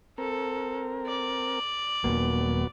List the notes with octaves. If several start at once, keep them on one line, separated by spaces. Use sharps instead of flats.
C4 A4 A#4
D5
D#1 F2 F#3 A#3 B3